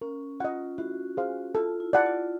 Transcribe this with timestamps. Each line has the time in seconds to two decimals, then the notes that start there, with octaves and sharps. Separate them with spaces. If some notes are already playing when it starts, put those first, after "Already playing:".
0.01 C#4 A#4
0.40 F4 D#5 F#5
0.78 E4 F#4
1.17 G#4 C5 F5
1.55 F4 A4
1.80 E4
1.93 D5 F#5 A5
2.06 F4